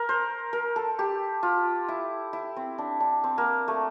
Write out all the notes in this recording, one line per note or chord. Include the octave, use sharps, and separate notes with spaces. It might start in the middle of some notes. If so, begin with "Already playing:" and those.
Already playing: A#4
C5
A#4
A4
G4
F4
E4
E4
C4
D4
D4
C4
A#3
A3